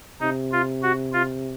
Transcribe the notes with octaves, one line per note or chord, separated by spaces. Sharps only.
C3 D#4
F4
F#4
F4